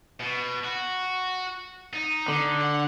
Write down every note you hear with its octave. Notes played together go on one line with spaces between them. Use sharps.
B2
F#4
D#4
D3
F#5